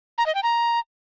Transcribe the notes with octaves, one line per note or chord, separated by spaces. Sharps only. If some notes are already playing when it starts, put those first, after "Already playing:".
A#5
D#5
G5
A#5